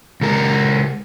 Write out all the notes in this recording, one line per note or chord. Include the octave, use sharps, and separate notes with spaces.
C#2 A#4